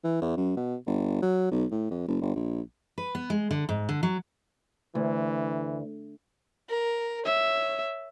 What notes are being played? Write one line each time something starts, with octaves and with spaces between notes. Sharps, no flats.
E3
E2
F#2
B2
G1
F#3
B1
A2
F2
F#1
G1
A#1
B4
B3
G#3
D3
G#2
D3
F#3
D2 E3
A#4
C#5 E5